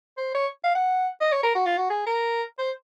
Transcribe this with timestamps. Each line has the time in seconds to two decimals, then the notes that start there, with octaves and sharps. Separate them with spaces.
0.18 C5
0.35 C#5
0.64 F5
0.75 F#5
1.21 D#5
1.32 C#5
1.43 A#4
1.55 F#4
1.66 F4
1.77 F#4
1.90 G#4
2.06 A#4
2.58 C5